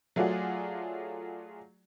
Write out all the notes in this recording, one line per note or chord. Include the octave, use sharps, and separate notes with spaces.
F#3 A3 F4 G#4 D5 F#5